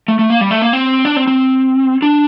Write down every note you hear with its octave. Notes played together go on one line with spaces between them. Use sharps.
A3
A3
A#3
G3
A3
A#3
C4
D4
C4
C4
D4